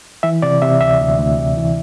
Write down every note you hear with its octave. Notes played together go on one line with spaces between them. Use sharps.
E3 E5
C3 D5
C3 E5
D2 E5
D2
D2
C3
E3